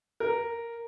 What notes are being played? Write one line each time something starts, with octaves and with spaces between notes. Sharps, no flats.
A#4